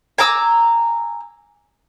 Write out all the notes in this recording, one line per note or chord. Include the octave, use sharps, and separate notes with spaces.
G#5 A#5 D6 E6